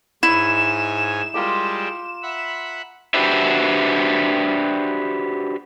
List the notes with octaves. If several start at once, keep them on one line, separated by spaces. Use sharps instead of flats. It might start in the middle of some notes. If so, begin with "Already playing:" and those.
G#2 E4 C#5 D#5 G#5 E7
G3 G#3 F4 G4 A#4 D6
E5 F#5 B5
D4 F#4 G4 B4 C5 E5